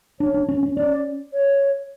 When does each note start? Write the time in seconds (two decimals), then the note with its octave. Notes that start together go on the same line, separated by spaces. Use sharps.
0.20 D4 C#5
0.34 D4
0.49 C#4
0.63 C#4
0.77 C#4 D5
1.33 C#5